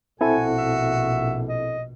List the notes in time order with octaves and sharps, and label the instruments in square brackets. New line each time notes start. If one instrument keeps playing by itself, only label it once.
[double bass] A#1 B2 [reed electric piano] C4 E4 A4 [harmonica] F#4 [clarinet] G#5
[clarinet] E5
D#5